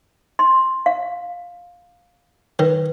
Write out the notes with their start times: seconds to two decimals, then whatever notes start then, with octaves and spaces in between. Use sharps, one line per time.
0.39 C6
0.86 F5
2.59 D#3 B4